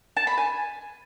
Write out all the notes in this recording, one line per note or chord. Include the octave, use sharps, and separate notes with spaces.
A5
B5
G#5